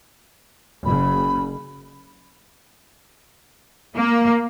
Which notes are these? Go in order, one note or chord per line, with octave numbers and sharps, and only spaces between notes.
F#1 C#3 B5
A#3